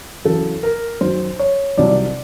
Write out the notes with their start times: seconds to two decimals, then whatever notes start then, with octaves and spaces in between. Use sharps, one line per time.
0.25 E2 C#3 F#3 A4
0.63 A#4
1.01 F#2 D#3 F#3 C5
1.39 C#5
1.77 C2 C3 D#3 F#3 D5